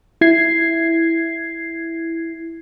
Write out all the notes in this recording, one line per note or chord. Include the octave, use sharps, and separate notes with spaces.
E4 G#6 C7